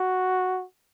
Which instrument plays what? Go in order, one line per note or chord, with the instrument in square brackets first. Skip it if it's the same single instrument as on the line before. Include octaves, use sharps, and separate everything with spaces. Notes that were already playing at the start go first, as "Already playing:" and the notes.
Already playing: [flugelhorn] F#4